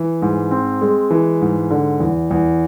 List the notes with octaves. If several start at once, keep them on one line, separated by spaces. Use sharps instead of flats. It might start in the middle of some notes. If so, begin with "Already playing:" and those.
Already playing: E3
G#2
C4
G#3
E3
G#2
D3
E2
E2